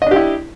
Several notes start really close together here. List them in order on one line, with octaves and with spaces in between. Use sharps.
D#5 D4 G4 E4